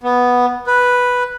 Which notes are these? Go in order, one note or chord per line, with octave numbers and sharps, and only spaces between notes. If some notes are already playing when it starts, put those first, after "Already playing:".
B3
B4